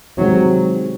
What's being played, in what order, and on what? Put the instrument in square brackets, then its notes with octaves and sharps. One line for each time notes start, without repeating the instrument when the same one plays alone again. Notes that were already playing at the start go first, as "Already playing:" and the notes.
[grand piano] C3 D#3 G#3 C4 [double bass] F#3